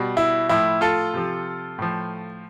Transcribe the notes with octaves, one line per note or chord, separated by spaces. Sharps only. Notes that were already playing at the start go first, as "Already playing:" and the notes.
Already playing: B2 G3
E4
A2 F3 E4
F4 A4
C3 F3
A2 F3